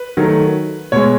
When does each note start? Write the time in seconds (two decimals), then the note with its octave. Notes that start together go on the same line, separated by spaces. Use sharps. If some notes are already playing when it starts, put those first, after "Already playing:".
Already playing: B4
0.17 D#3 F#3 A3
0.92 B2 G#3 C#5